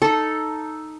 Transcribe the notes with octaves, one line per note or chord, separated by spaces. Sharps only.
D#4 A4